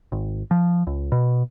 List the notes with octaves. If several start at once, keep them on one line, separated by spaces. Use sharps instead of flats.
G#1
F3
C#2
B2